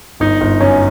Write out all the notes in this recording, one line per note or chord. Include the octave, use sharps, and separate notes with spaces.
G1 D#4
G1
F#2 C#4